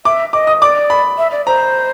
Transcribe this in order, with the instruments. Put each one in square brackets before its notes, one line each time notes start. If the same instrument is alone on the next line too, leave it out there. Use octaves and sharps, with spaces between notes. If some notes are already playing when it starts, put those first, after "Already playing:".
[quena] E5 [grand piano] D6
[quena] D#5 [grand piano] D6
[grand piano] D#6
[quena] D5 [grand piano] D6
[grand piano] B5
[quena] E5
D5
[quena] C5 [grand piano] A#5